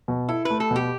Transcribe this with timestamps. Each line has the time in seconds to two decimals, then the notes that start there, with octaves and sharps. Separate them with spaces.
0.08 B2
0.29 E4 A4
0.45 B4
0.50 A3
0.60 A4
0.71 B2
0.76 G4